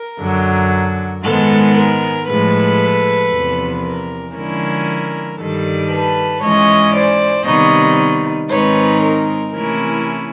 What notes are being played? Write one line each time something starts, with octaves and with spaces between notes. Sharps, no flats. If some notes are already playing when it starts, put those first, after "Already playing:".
Already playing: A#4
F#2 D3 F#3
G#2 D#3 G#3 B3 A4
A#4
A2 F3 G#3 A4 B4
E2 C3 F3
A#4
D3 F3 G#3 C#4 E4 A#4
G2 D#3 G3 A4
A4 B4
G#2 E3 G#3 C#4 C#5 D#5
C5 D5
C3 D#3 G3 B3 D#4 C#5 D#5
G#2 D#3 G#3 C4 D#4 B4 C#5
A#4
C3 E3 A3 C#4 E4 A#4